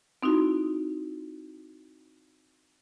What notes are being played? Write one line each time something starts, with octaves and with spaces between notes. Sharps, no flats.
C4 D#4 E4 F#4